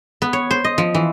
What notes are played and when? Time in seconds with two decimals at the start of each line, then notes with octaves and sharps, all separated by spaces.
0.22 B3
0.33 C#5
0.51 C5
0.65 D#5
0.78 F3
0.95 E3